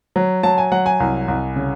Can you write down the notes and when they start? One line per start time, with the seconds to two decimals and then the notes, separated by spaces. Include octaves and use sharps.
0.16 F#3
0.43 F#3 A5
0.58 G#5
0.72 F#3 F#5
0.86 G#5
1.00 C2
1.28 C2
1.56 C#3